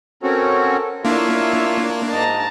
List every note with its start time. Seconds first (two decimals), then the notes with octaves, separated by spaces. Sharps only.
0.23 C4 C#4 F#4 A4 A#4
1.05 A#3 D4 E4 F4 C#5 E5
2.12 G#2 D#5 A5 A#5